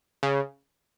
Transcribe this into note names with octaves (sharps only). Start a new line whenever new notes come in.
C#3